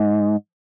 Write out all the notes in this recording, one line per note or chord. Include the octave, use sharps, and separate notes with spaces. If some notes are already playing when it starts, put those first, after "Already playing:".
Already playing: G#2